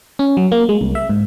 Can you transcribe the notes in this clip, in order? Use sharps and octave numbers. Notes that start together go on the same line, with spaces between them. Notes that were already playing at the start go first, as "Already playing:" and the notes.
C#4
F#3
A#3
G#3
C2
E5
G#2